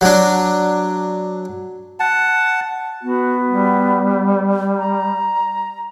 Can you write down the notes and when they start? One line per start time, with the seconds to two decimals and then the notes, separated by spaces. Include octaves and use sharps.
0.01 F#3 D4
2.00 F#5 A5
3.03 B3 F#4
3.48 G3
4.78 A#5